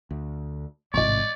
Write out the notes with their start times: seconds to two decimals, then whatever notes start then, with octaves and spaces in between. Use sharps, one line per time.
0.11 D2
0.94 A1 G#2 C3 D5 D#5 C#6